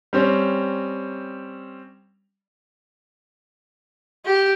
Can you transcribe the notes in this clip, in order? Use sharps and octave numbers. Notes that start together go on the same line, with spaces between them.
G3 C4 C#4
G4